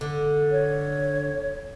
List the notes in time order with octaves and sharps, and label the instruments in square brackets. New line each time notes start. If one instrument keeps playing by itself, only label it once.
[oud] D3
[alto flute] C#5